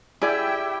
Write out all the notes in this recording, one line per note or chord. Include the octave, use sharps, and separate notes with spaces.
E4 G4 G#4 D5 E5 G5